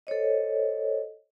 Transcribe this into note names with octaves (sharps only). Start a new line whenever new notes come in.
A4 C5 C#5 D#5